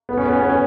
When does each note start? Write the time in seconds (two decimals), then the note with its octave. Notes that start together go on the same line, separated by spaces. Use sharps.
0.09 B3
0.17 C#4
0.25 B3
0.33 C#4
0.41 B3
0.50 C#4